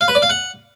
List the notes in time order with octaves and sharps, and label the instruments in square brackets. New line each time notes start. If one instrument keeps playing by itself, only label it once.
[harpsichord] F5
B4
D5
F5
F#5